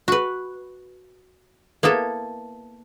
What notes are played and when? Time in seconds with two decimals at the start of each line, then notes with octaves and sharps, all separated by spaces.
0.08 F#4 B4
1.83 A#3 B3 E4 A4